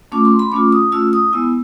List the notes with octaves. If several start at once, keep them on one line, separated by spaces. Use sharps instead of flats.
A3 C#4 F4 D6
C6
B5
A3 C#4 F4 D6
D#6
A3 C#4 F4 E6
D#6
G#3 B3 E4 E6